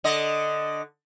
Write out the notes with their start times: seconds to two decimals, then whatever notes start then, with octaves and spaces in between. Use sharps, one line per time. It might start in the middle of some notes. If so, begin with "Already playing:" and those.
0.04 D3 D#5